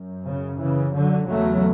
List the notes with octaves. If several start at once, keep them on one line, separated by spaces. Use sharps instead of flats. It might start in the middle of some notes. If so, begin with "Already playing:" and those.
Already playing: F#2
C#3
C#3 E3
D3 F#3
E2 C#3 F#3 A3